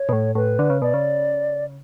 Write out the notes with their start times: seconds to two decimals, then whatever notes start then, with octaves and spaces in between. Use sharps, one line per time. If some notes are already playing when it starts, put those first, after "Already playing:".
Already playing: C#5
0.09 B2
0.13 A2
0.35 A2 B4
0.59 D3
0.70 C#3
0.82 B2 D5
0.94 C#3